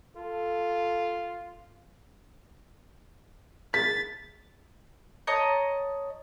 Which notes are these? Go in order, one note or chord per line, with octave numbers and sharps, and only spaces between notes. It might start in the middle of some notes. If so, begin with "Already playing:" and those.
F4 A4
A6 B6
C#5 D#5 A5 A#5